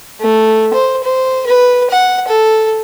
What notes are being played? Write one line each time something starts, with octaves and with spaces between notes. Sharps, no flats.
A3
C5
C5
B4
F#5
A4